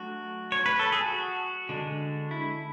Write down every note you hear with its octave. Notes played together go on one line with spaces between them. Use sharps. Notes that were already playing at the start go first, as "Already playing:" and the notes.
Already playing: F#3 A3 D4 F#4
C#5
B4
A4
G#4
F#4
D3 G#3 D4
E4